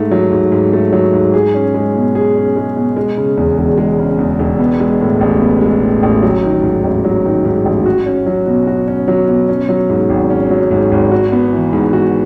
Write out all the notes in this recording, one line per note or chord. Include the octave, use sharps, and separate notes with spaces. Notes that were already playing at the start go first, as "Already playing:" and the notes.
Already playing: G#2 A3
F#3
G#2
G#2
A3
F#3
G#2
G#4
C#4
G#3
B2
G#4
C#4
G#3
B2
G#3
C#3
E2
E1
G#3
C#3
E2
E1
B3
G#3
A2
A1
B3
G#3
A2
A1
F#3
D#3
G#2
A1
F#3
D#3
G#2
A1
F#4
C#4
F#3
B2
F#4
C#4
F#3
B2
C#4
F#3
G#2
G#1
C#4
F#3
G#2
G#1
F#4
B3
E3
G#2
F#4